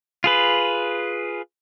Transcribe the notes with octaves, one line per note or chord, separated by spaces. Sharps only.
F4 G#4 B4